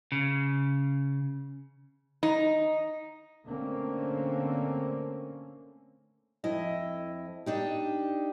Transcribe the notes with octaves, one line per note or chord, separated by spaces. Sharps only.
C#3
D#4
D3 A3 A#3 C4 C#4
F2 E4 D#5
D4 D#4 G4